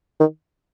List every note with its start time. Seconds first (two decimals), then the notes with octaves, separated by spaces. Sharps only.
0.20 D#3